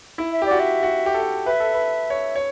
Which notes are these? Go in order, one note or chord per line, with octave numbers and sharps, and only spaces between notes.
E4
E5
G4
F#4 D5
E5
F#4
G4
A4
B4 E5
A4
B4
C#5
C#5